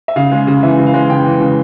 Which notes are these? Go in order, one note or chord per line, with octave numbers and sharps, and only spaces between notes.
E5
C#3 F5
G#3
C#3
E3 E5
C#3
F5
G#3
C#3 G5
E3
C#3